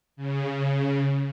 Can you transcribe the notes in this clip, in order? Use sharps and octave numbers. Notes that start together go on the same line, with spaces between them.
C#3